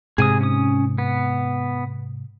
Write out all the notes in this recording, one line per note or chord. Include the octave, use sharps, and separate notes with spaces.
G#2 C3 G#4 G#5 D#6
C#4 D#6
B3